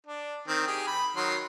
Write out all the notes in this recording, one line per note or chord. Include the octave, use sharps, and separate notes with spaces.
D4
D#3 C4
G4 G#4
B5
D#3 F#3 C6